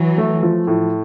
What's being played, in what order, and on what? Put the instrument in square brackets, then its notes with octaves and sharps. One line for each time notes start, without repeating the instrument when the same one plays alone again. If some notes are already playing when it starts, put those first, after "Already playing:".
Already playing: [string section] E3 F#3
[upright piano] A3
F3
A2